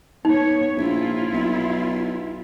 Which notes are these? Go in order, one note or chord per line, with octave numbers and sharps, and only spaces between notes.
B3 D#4 C#5
A#1 E4 F4
B1